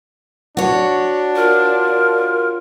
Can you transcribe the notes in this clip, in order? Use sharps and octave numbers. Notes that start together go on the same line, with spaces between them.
D4 F#4 C#5
F4 A#4